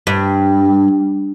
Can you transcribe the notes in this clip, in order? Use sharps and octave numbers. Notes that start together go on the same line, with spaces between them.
G2